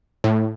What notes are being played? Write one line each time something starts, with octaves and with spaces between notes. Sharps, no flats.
A2